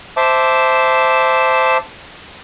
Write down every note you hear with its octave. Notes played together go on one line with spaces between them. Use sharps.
C5 E5 A5 D6